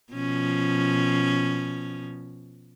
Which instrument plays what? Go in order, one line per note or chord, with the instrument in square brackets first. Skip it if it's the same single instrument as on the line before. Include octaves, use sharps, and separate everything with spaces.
[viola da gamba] B2 F3 C#4